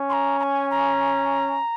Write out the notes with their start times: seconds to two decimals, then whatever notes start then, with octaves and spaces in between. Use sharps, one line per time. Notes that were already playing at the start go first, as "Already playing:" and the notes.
Already playing: C#4
0.09 C6
0.13 A#5
0.39 A#5
0.43 G#5
0.70 A#5